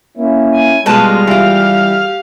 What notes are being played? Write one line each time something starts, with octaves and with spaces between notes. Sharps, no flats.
A#3 C#4 E4
G#5
B2 G3 G#3 F4 B4 A5 F6
E3 F4 G4 F5